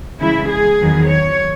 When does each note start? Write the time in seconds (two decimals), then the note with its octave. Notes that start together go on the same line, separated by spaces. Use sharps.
0.20 C#3 E3 G#3 E4
0.50 G#4
0.80 E2 D#3 F#3 B3
1.09 C#5